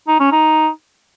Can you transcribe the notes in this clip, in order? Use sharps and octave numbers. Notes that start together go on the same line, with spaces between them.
D#4
C#4
D#4